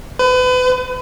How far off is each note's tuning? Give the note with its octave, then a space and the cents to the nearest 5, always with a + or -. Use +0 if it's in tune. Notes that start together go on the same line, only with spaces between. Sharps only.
B4 +35